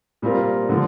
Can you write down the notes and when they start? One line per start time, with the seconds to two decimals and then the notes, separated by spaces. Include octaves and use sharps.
0.22 A#2 G3 C4 F4 A#4
0.69 D3 F3